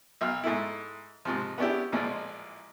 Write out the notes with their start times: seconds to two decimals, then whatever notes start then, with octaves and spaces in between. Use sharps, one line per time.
0.21 B1 F5
0.43 G#2 A3 E4
1.25 G#2 C3 F3
1.58 B3 C#4 D4 E4 G4
1.92 A1 A#2 F3 G#3